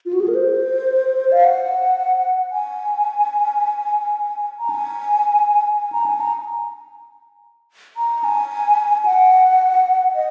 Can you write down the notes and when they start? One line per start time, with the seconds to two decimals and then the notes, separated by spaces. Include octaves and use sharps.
0.06 F4
0.13 F#4
0.20 G#4
0.28 A#4
0.35 C5
1.32 F5
1.44 F#5
2.52 G#5
4.59 A#5
4.70 G#5
5.79 G#5
5.92 A#5
6.06 G#5
6.21 A#5
7.97 A#5
8.24 G#5
9.05 F#5
10.15 D#5